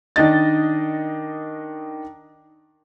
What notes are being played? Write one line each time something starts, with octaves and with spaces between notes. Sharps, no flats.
D#3 D4 D#5 A6